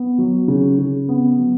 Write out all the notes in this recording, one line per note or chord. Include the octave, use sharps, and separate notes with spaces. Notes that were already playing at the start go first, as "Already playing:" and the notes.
Already playing: B3
F#3
C#3
C#3
B3
F#3